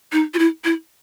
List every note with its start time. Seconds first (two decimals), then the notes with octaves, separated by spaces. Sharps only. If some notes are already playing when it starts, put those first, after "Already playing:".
0.12 D#4
0.34 F4
0.39 E4
0.64 E4